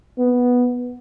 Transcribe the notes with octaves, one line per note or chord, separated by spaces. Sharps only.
B3